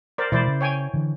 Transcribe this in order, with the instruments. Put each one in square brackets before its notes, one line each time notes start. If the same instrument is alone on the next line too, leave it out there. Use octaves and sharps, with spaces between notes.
[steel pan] A#4 C5 D5
[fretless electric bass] B2 E3 G#3 [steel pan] E4 C5 D5
[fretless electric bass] C#3
[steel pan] C#5 G5 G#5
[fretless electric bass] D3 E3